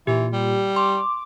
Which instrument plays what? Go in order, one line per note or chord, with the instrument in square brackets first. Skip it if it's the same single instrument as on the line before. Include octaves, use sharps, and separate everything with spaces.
[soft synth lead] A#2 [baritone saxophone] E3 [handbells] G4
[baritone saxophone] G3
[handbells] C6 [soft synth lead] D6